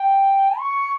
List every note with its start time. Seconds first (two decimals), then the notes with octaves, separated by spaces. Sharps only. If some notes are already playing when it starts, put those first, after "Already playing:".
Already playing: G5
0.59 C#6